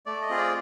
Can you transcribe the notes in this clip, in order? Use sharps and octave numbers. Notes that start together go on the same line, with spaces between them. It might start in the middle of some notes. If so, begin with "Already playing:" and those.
A3 D5
D#5
C4 F4 G#4
D5